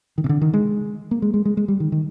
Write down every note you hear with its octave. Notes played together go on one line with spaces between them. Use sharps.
D#3
C3
D3
D#3
G#3
A#3
G#3
G#3
G#3
G#3
G3
D#3
D#3